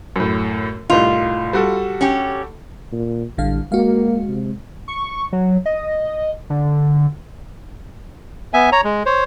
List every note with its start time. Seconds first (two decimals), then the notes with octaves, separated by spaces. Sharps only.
0.16 F#2 A2
0.90 C2 A2 D#4 F4
1.53 G3 F#4 A4
2.01 C#4 G4
2.92 A#2
3.38 A1 D3 G3 F5
3.72 G#3 A#3 F#4 F5
4.29 C3
4.88 C#6
5.33 F#3
5.66 D#5
6.50 D3
8.54 B3 E5 G#5
8.72 C#5 A#5
8.84 G#3
9.06 C5 C#5